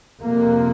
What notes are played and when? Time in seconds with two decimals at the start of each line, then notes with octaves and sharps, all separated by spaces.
0.22 F2 C3 A#3